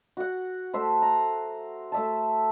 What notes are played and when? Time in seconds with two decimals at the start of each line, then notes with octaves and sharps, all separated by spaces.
0.17 F#4 F#5
0.73 A3 C5 E5
1.02 A#5
1.92 A3 E5 A5